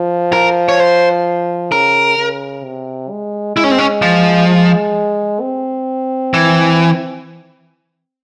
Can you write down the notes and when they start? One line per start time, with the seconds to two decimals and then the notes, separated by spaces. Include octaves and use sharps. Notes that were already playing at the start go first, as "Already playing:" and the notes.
Already playing: F3
0.33 A#4
0.69 C#5
0.80 C5
1.72 C#3 A#4
2.18 C#3
2.64 C3
3.10 G#3
3.57 G#3 E4
3.64 C#4
3.71 C4
3.78 C#4
4.02 F3
4.48 G#3
5.41 C4
6.34 E3